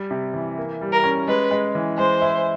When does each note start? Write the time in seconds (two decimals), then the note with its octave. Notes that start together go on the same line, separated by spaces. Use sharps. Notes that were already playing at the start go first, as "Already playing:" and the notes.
Already playing: G3
0.11 C3
0.34 E3
0.58 A#3
0.81 G3
0.93 A#4
1.04 C#4
1.28 G#3 B4
1.51 G#3
1.75 E3
1.98 G#3 C5
2.22 E4